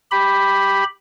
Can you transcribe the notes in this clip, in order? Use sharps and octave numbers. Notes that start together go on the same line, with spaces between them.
G4 B5